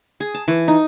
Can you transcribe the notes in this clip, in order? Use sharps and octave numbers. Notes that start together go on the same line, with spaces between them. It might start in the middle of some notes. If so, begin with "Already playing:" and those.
G#4
A5
E3
D#4